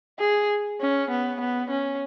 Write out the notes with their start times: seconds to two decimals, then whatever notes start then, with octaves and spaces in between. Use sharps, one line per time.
0.20 G#4
0.81 C#4
1.10 B3
1.40 B3
1.70 C#4